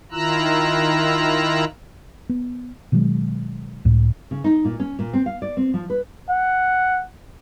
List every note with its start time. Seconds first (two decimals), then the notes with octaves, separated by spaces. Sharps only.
0.12 D#3 E4 F4 A#5 E6 F#6
2.29 B3
2.92 B2 D#3 F#3 G#3
3.85 C#2 A2
4.31 C#3
4.44 D#4
4.65 A#2
4.80 C#4
4.99 A#2
5.13 C4
5.26 F5
5.42 D5
5.57 C4
5.74 F3
5.90 B4
6.30 F#5